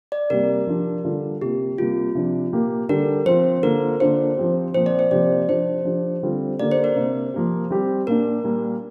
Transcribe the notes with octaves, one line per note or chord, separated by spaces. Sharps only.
D5
C3 G3 A#3 G4 A#4
F3 D4 G4
D3 G3 D4 F4
C3 A#3 F4 G4
C3 G3 A#3 F4 G4
C3 F3 D4
A#2 A#3 G4
D3 G3 D4 G4 A#4
F3 C4 F4 C5
D3 A#3 F4 A#4
D3 A#3 D4 F4 C5
F3 C4 G4
A#2 F3 C4 C5
D5
C5
C3 F3 A#3 G4 D5
F3 D4 G4 C5
F3 D4 G4
D3 G3 C4 F4
D3 A#3 G4 D5
C5
A#4
C3 A#3 D4
F3 A#3 G4
G3 C4 G4
A#2 A#3 D4 A#4
A#2 G3 A#3